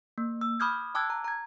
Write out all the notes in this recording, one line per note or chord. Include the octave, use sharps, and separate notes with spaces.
A#3
E6
B5 D6 D#6 F6 G6 G#6
G5 A5 D6 E6 F#6 G#6
A#5
A#5 G#6